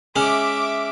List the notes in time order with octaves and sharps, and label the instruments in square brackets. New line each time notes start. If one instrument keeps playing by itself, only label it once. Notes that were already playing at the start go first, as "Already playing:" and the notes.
[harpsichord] G#3 C#4 [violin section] E5 D6